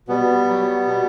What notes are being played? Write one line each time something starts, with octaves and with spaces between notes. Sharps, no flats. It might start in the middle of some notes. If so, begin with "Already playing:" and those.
B2 G3 B3
F#3
B2